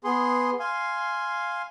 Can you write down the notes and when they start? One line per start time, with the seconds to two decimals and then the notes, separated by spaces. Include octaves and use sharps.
0.04 B3 G#4 C6
0.60 F5 G#5 C6